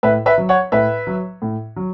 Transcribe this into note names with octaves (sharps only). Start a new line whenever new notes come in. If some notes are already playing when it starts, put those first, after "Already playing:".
A2 B4 E5
B4 E5
F#3
C#5 F#5
A2 B4 E5
F#3
A2
F#3